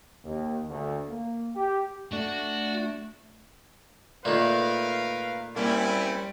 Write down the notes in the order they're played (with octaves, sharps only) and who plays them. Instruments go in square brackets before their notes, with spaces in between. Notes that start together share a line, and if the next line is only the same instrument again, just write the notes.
[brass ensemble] D#2
D2
A#3
G4
[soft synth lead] A3 [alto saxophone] D4 [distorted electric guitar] F#4
[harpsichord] A#2 D#3 [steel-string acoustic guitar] A3 [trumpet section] A#4 B4 F5
[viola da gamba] G3 [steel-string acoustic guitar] A#3 [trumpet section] C4 C#4 E4